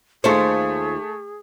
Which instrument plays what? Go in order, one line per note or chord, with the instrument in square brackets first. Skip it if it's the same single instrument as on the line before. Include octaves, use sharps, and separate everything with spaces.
[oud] D#2 F4 C5 [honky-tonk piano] A3 C#7 [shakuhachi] G#4